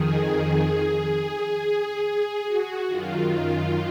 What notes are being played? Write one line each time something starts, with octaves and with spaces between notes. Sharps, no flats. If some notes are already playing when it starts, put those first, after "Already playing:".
Already playing: F2 D#3 G#4
G#4
F#4
F#2 D#3 F4
F4